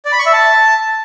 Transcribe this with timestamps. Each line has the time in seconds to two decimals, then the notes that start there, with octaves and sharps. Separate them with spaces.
0.05 D5
0.12 B5
0.19 C#6
0.26 E5
0.33 A5